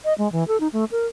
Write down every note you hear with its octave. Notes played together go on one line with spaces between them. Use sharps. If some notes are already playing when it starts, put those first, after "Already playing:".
D#5
G#3
E3
A4
D#4
A3
A#4